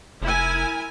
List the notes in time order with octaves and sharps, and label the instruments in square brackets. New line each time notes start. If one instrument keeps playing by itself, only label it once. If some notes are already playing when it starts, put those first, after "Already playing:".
[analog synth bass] F1 [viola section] E4 A#4 G#5